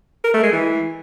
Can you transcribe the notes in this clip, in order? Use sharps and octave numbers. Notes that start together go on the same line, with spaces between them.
A#4
A3
G#3
E3